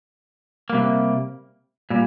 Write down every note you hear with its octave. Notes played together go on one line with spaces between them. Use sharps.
C3 G3 A#3
A#2 G3